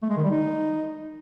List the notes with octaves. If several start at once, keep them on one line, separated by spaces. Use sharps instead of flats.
A3
G#3
D#3
G3
D#4